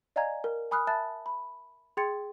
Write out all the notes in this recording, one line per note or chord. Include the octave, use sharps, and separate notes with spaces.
D5 D#5 F5 G#5 A#5 G#6
A#4
G#5 B5 D#6 F6 F#6
E5 A5 B5 F#6 A6
B5
G#4 G5 C6 G#6 A6 C#7